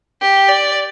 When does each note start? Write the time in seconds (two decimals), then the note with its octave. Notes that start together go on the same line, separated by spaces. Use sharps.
0.21 G4
0.49 D5